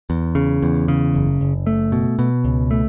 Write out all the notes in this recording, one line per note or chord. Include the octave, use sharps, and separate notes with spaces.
E2
C#3
E2
C#3
F#1
F#1
A3
B2
B2
C#2
A3